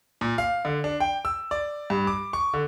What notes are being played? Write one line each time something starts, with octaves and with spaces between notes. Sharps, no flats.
A#2
F5
D3
D4
G5
E6
D5
G2
D6
C#6
D3